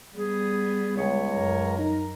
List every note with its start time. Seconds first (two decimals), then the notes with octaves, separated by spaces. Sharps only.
0.15 G3 B3 G#4
0.97 C#2 C#5
1.33 F#2 A#4
1.78 D#4